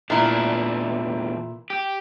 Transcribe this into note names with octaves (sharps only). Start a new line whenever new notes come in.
E2 A#2 A3 D4 E4
G4